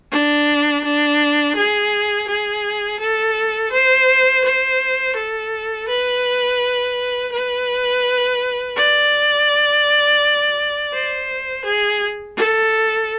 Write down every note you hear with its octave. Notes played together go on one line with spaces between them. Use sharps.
D4
D4
G#4
G#4
A4
C5
C5
A4
B4
B4
D5
C5
G#4
A4